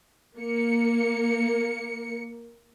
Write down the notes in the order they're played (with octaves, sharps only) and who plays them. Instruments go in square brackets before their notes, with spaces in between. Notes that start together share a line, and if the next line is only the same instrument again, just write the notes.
[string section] A#3 C#7